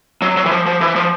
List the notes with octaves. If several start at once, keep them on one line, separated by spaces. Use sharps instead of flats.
F#3
F#3
E3
F3
F3
E3
F3